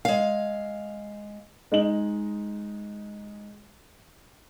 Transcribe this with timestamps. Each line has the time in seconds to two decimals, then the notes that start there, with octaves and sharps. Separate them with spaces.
0.05 G#3 F5
1.72 G#3 D#4 D#5 F#7